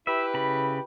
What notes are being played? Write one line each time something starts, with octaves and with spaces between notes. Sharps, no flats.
E4 G4 B4 E5
C#3 B5